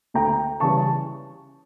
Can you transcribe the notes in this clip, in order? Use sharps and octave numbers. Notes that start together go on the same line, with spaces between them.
D2 G5 A#5
C#3 E3 G3 C#4 A5 C#6